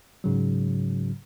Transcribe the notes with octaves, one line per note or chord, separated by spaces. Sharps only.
G#2 C#3 F#3